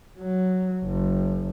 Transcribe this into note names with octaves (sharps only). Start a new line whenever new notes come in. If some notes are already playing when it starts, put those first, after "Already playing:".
F#3
F#1